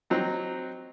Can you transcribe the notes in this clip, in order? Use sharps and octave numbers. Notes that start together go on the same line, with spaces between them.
F#3 C4 D#4